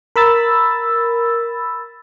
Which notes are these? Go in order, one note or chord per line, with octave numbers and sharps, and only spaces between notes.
A#4 B5 E6 A6